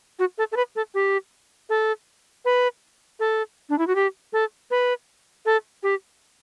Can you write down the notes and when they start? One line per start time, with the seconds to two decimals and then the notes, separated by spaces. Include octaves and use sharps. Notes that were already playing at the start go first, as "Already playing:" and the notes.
0.19 F#4
0.38 A4
0.52 A4
0.56 B4
0.76 A4
0.94 G4
1.69 A4
2.45 B4
3.20 A4
3.70 D4
3.78 E4
3.87 F#4
3.95 G4
4.33 A4
4.71 B4
5.46 A4
5.83 G4